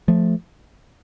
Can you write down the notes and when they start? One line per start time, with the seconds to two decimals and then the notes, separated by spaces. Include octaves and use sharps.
0.08 F3 A3